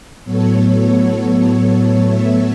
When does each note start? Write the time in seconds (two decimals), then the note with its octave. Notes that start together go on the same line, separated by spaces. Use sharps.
0.24 A2 F#3 B3 A4 C#5
2.06 C#5 E5